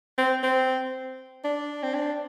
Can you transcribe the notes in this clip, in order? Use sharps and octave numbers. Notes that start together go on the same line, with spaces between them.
C4
C4
D4
C4
D4